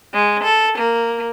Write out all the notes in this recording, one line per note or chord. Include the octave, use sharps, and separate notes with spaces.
G#3
A4
A#3